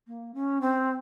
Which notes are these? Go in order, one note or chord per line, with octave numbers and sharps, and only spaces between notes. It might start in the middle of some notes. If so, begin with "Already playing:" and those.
A#3
C#4
C4